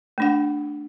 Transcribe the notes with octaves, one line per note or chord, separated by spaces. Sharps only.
A3 D4 F#5